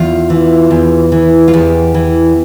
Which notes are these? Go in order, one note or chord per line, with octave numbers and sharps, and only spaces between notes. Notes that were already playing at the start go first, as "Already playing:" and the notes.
Already playing: E2 F4
E3
E2
E3
F4
E2 G4
E3